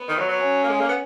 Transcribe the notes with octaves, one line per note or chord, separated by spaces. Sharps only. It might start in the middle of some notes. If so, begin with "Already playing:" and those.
Already playing: B3
D#3
F#3
F#3
C#4
A#3
G#3
A#3
B3